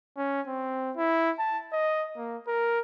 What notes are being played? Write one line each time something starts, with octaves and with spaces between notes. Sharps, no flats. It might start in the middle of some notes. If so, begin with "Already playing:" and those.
C#4
C4
E4
A5
D#5
A#3
A#4